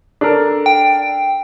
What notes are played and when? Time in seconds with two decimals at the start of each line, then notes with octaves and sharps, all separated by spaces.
0.21 D4 A4 A#4
0.66 G5